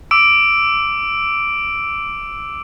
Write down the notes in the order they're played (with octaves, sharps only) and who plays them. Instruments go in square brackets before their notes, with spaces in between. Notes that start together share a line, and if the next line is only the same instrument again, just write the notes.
[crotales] D6 E6 D7